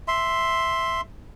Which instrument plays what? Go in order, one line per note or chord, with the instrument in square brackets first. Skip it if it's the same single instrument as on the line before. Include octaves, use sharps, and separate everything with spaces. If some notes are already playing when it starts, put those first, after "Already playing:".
[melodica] E5 C6